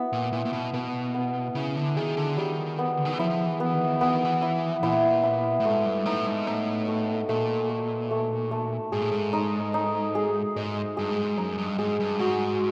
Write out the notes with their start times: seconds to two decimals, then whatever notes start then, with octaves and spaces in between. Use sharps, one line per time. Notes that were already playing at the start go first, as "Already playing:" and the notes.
Already playing: B3 E4
0.13 A#2
0.33 A#2 E4
0.45 A#2
0.53 B2
0.73 B2 B3
1.14 B3
1.55 C#3 E4
1.76 D3
1.97 D#3 G#4
2.17 D3
2.37 D#3 G3
2.79 B3
2.97 D3
3.05 D#3
3.12 E3
3.19 F3 E4
3.46 E3
3.60 B3
3.73 D#3
4.01 E3 B3
4.13 D#3
4.25 E3
4.42 E4
4.83 A#2 E4
5.23 E4
5.60 A2
5.65 G#2 A3
5.85 G2
6.06 A2 D#4
6.27 G#2
6.47 A2 D#4
6.88 A3
7.29 A#2 A3
7.69 A3
8.11 A3
8.51 A3
8.92 G#2 G#4
9.02 A2
9.11 G#2
9.33 D#4
9.74 D#4
10.15 G#4
10.56 G#2 D#5
10.97 G2 G#4
11.11 G#2
11.38 F#2 D#4
11.58 G2
11.78 G#2 G#4
12.00 G2
12.19 G#2 F#4